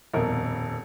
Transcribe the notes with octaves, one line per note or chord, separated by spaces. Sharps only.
D#1 F2 B2 A#4 D#5